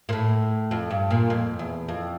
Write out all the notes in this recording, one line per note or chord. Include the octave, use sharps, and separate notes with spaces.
A#2
A2
F2
G2
A#2
F2
E2
F2